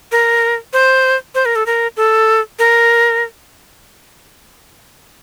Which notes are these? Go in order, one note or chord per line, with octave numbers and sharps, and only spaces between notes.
A#4
C5
C5
A#4
A4
A#4
A4
A#4